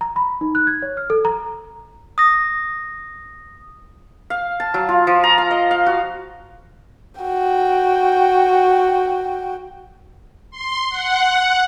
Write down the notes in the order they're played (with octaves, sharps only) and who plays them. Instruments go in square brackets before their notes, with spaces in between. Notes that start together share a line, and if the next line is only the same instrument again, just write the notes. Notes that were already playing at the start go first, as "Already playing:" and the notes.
[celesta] A#5
B5
D#4
F#6
G#6
C#5
F6
A4
A#5
[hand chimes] D#6 A#6
[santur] F5
A5
F#3
F4
F3
A#5
F5
D#5
F5
F#4
[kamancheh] F#4 G5
[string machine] C6
F#5